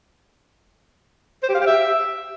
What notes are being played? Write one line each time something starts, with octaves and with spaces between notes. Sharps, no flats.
C5
G4
F5
G4
E5